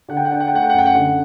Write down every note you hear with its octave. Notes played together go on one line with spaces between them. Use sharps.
D3 F#5
G5
F#5
D4 G5
F#5
G5
A3 F#5
G5
F#5
F#2 G5
F#5
D3